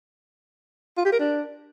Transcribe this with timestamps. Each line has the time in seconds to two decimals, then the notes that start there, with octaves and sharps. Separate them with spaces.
0.97 F4
1.05 G4
1.12 A#4
1.20 D4